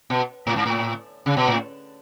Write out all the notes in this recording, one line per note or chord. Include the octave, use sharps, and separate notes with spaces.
B2
A2
G#2
A2
C#3
B2
A2